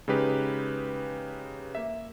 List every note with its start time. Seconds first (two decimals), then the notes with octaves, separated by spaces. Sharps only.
0.08 C#3 G#3 D#4 G4 B4
1.75 A#3 E5